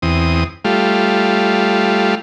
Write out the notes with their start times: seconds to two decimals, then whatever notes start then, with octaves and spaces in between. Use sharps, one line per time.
0.02 E2 C4 D#6
0.65 G3 A3 F4